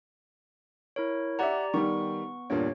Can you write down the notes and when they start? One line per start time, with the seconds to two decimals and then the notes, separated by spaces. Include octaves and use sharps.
0.96 E4 A#4 C#5
1.39 G4 D5 E5 F#5 A#5
1.74 D#3 G3 B3 C#6
2.50 E2 G2 A#2 C#5